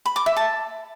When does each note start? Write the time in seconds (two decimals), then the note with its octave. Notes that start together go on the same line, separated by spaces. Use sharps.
0.06 B5
0.16 D6
0.26 E5
0.36 A5